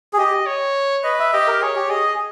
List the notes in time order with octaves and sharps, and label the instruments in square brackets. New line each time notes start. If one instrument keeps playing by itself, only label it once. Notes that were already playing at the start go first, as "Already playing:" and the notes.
[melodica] G#4
[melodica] G4 [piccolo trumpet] D#5
[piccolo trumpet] C#5
[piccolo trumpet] B4 [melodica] D#5
[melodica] E5
[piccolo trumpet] G4 [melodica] D#5
[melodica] A#4
[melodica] G#4 [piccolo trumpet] C#5
[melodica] G4
[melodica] G#4 [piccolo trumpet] D#5